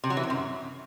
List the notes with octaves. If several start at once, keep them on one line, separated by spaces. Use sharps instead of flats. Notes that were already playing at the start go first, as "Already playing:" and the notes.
C3
F#3
E3
C3
F#2